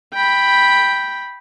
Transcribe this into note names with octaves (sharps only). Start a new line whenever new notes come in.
G5 B5